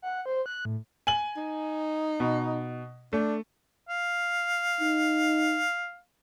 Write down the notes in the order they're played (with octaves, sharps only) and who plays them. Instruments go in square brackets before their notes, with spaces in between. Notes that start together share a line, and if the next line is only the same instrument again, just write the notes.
[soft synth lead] F#5
C5
F#6
A2
[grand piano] G#5 F#7
[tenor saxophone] D#4
[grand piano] B2
[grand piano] A3 [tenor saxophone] D4
[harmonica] F5
[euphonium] D#4